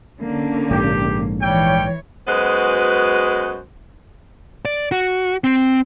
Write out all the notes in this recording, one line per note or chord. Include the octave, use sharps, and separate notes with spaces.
D3 A#3 C#4
A#1 G#2 G4
E3 G3 C#5 G5
F#2 G#3 B3 F#4 B4 C5
D5
F#4
C4